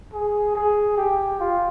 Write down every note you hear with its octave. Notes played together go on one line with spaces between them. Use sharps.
G#4
G#4
G4
F4